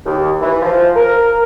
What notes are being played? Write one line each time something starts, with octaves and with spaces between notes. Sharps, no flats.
D#2
E3
F3
A#4